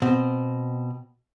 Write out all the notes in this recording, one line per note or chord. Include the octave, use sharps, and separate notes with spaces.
B2 C4